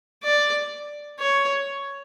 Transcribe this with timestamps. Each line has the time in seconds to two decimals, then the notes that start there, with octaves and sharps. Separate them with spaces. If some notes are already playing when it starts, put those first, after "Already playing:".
0.23 D5
1.19 C#5